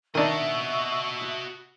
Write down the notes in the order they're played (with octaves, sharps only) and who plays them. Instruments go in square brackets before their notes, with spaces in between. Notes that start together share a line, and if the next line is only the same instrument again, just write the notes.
[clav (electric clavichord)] D#3 D4 [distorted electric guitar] F#4 D#5 [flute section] E5 C#6 E6